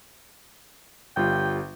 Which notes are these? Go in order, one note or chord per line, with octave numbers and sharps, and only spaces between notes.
G1 G3 F4 G5